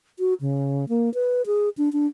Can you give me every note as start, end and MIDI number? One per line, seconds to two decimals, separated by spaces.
0.19 0.34 66
0.41 0.85 49
0.89 1.12 58
1.14 1.42 71
1.46 1.69 68
1.78 1.92 62
1.93 2.07 62